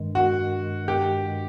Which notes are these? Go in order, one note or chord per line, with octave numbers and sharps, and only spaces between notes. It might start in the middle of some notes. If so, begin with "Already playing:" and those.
Already playing: G2 D#3 G#3
F#4
G4